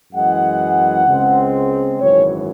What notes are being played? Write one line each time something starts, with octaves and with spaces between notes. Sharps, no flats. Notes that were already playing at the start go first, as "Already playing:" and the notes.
F#2 E3 G#3 F#5
C#2 C#3 G#3 C4
G#1 F#2 E3 C#5